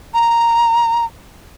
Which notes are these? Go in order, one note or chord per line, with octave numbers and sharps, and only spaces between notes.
A#5